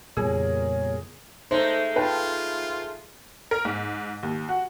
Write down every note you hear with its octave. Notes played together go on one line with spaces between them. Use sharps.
F2 A#2 C#3 G3 B3 G#4 A#4 C#5
G#3 A3 D#4 C5
F4 B4 G5 A5
A#4
G#2
D#2
F#4